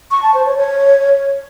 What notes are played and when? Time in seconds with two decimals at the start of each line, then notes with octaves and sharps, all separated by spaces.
0.11 C#6
0.23 A5
0.34 C5
0.46 C#5
0.57 C#5